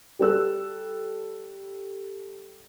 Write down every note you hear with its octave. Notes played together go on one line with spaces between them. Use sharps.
G3 A4 E6 F#6